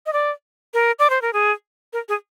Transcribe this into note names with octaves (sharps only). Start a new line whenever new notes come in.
D#5
D5
A#4
D5
C5
A#4
G#4
A#4
G#4